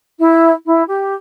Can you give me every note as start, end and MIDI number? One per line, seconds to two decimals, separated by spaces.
0.19 0.51 64
0.65 0.83 64
0.88 1.14 67